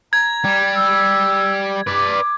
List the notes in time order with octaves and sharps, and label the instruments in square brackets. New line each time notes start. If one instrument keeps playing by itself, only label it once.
[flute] A#5 [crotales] G#6
[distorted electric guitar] G3
[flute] E6
[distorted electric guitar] B4 D5 [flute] D6